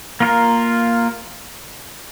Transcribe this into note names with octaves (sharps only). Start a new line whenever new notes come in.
A#3 F4 A#4